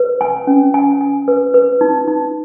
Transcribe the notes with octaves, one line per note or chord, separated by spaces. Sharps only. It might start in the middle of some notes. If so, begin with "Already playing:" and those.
Already playing: B4
G#5
C#4
G#5
G#5
B4
B4
D#4
D#4